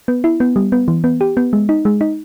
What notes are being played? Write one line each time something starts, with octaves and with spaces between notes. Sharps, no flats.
B3
E4
B3
G3
B3
E3
B3
G4
B3
G#3
D#4
G#3
D#4